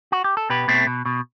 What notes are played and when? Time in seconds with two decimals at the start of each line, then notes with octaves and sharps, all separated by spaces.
0.12 F#4
0.24 G4
0.37 A4
0.50 B2 G4 B4
0.68 B2 A3 C4
0.87 B2
1.06 B2